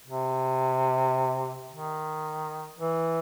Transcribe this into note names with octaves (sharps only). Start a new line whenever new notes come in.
C3
D#3
E3